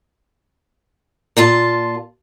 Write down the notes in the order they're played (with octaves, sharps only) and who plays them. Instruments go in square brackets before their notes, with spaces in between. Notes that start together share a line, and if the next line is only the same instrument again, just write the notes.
[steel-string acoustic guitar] A#2 F4 A5